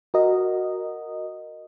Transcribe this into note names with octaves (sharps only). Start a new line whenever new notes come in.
F#4 A#4 D#5